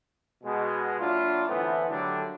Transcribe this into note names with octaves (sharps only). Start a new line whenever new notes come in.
B2 G#3
A#2 F#3 D4 E4 F4
A2 D3 E3 A3 B3 C4
D3 D#3 F#3 G3 A3 D4